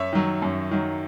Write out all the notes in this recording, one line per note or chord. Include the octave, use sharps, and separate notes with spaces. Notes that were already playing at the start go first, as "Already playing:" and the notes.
Already playing: F#2 C#5 E5
D#3 F#3
F#2
D#3 F#3